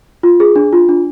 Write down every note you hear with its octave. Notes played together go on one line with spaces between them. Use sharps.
F4
G#4
D4
F4
D4